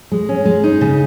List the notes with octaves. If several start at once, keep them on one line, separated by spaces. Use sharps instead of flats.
G#3
C#4
G#3
D#4
C#3